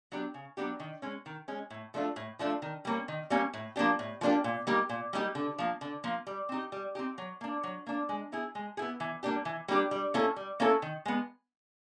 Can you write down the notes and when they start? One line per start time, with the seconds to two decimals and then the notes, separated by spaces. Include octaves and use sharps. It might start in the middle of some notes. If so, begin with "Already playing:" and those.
0.12 F#3 B3 D4 G4
0.34 C#3
0.57 F#3 B3 D4 G4
0.80 D#3
1.02 G#3 C#4
1.26 D#3
1.48 G#3 C#4
1.70 A2
1.94 F3 A3 D4 F4
2.16 A2
2.39 F3 A3 D4 F4
2.62 D#3
2.85 G3 A#3 C#4
3.08 D#3
3.30 G3 A#3 C#4
3.54 A2
3.76 F3 A#3 D4 G4
3.99 A2
4.21 F3 A#3 D4 G4
4.44 A#2
4.67 G3 A#3 D#4 G4
4.89 A#2
5.13 G3 A#3 D#4 G4
5.35 D3
5.58 F3 A#3
5.81 D3
6.04 F3 A#3
6.27 G3
6.49 C4 D#4 G4
6.72 G3
6.95 C4 D#4 G4
7.18 F#3
7.41 A#3 D4
7.63 F#3
7.87 A#3 D4
8.09 G#3
8.32 B3 E4 G#4
8.55 G#3
8.77 B3 E4 G#4
9.00 E3
9.23 G3 A#3 D4 G4
9.45 E3
9.68 G3 A#3 D4 G4
9.91 G3
10.14 A#3 C#4 E4 A4
10.36 G3
10.60 A#3 C#4 E4 A4
10.82 D#3
11.05 G#3 B3